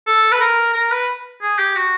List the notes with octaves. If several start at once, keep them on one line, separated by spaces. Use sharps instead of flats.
A4
B4
A#4
A#4
B4
G#4
G4
F#4